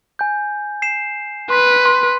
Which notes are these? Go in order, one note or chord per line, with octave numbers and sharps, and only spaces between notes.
G#5 G6
C7 E7
B4 C6 B6
C6